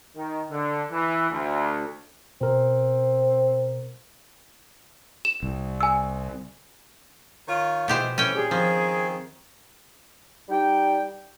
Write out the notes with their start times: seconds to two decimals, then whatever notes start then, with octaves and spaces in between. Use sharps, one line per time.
0.16 D#3
0.50 D3
0.92 E3
1.31 D2
2.41 B2 C4 A#4
5.25 E7
5.43 C2
5.80 G#5 E6
7.47 D#3 F4 C#5
7.88 B2 F3 G#3 E4 G4 C5
8.18 E3 A3 C4 C#4 G5
8.35 A#2 G3 G4 G#4
8.51 D#3 F3 C4
10.49 G3 D#4 G5